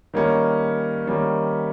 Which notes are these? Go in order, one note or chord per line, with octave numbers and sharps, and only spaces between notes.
D#3 G3 A#3 C#4
D#3 G3 A#3 C#4